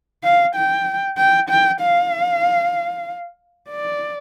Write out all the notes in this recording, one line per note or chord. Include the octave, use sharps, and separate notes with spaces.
F5
G5
G5
G5
F5
D5